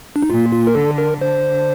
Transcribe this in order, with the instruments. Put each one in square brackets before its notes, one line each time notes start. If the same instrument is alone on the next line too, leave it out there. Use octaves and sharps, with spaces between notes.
[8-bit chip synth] D4
D#4
[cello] A#2 [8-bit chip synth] F4
[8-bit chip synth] F4
A#4
[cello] D3 [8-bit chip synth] A4
[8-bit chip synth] A#4
[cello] D3 [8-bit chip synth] C5